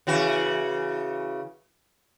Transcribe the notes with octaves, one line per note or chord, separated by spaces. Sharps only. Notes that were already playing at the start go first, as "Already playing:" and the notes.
C#3 E3 F#4